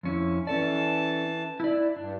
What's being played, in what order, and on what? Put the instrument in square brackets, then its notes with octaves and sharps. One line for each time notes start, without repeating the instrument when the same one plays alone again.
[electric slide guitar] F2 C#4 E4
[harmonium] E3 A5 [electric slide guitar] C#4 A4 D5
[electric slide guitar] E4 D5
[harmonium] G2 [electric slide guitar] D4